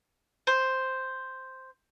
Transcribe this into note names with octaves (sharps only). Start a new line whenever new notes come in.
C5